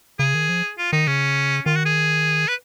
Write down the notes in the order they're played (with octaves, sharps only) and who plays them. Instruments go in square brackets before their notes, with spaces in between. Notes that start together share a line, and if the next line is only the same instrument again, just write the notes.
[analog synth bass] C#3 [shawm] G#4
[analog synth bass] D#3
F3
[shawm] F4
[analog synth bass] D#3 [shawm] D#4
[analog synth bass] C#3 [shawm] C#4
[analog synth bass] D#3 [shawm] F4
[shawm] F#4
G#4
B4